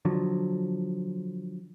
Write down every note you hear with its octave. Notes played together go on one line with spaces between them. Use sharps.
D3 F3 F#3